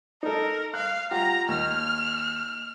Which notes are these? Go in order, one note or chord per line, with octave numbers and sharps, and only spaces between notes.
D#4 A4 A#4
F5 F#6
F4 G4 F#5 A#5
D#2 F6